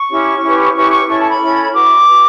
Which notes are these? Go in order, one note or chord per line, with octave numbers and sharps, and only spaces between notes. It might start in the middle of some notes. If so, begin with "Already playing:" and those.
Already playing: C#6
C#4 E4 G4 C#5
C#4 E4 G4 B4
C#4 E4 G4 B4 C#6
C#6
C#4 E4 A4 C#5 C#6
A5
B5
C#4 E4 A4 C#5
F#4 B4 D6
F#4 B4